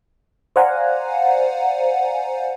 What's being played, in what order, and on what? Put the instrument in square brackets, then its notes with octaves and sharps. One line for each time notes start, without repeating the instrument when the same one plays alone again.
[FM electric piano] C5 D5 F5 F#5 G#5 A#5